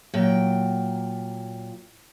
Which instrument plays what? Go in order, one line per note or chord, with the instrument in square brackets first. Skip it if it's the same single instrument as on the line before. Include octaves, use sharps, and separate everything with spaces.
[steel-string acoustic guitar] A#2 F#3 G5